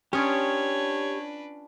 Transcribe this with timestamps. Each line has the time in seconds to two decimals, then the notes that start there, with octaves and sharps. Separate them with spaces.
0.13 C#4 D4 F4 G4 B4 C#5 D#6